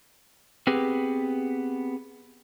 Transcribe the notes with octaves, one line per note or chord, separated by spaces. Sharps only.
B3 C4 G4 G#4 B4